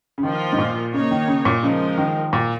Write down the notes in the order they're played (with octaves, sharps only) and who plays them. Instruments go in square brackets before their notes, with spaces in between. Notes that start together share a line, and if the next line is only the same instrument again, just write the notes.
[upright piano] C#3
[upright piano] D#3 [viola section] F3 A#3 F4
[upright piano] G#2
A#2
[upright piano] C#3 [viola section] A#3 D#4 C#5
[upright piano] D#3
C#3
A#2
[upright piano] C#3 [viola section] F3 G#3 D#4 A#4
[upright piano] D#3
A#2